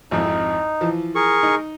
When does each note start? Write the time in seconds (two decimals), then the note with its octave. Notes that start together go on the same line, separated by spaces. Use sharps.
0.11 G#1 F2 D#4 E4
0.81 E3 F3
1.15 G#4 A#4 C#6
1.43 D#4